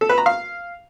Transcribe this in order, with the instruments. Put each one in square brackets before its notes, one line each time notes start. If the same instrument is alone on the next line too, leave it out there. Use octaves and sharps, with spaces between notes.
[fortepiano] A4
B4
A#5
F5